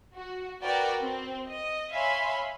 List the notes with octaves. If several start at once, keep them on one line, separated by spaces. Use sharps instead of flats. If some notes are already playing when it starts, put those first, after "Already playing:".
F#4
F#4 A#4 B4 D5 G5
C4
D#5
C#5 E5 F5 G#5 B5 C6